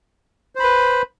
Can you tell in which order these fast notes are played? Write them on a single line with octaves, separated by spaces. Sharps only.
C5 B5 B4